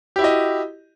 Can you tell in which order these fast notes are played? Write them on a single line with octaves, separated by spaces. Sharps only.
G4 E4 F#4 D#5